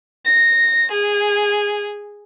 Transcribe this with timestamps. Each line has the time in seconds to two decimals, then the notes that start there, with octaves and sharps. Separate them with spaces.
0.25 A#6
0.92 G#4